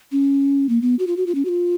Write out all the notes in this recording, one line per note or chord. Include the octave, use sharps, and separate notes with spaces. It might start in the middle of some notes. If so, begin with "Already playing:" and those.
C#4
A#3
B3
F#4
F4
F#4
F4
C#4
F#4
F4